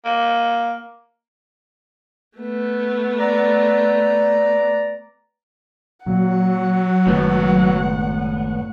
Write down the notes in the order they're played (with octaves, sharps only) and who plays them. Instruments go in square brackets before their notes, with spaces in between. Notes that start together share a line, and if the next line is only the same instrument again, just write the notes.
[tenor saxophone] A#3
[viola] A3 B3
[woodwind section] D5 A#5
[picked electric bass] A#2 [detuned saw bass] F#3 [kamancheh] F#5
[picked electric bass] F#1 D#3 G#3 [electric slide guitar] A2 B3